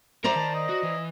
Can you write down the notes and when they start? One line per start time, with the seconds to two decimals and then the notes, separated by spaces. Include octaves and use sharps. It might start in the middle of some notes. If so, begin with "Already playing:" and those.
0.24 A#4 C5 D5 E5 A#5
0.36 D#3 A5
0.54 D#5
0.69 F#4
0.83 E3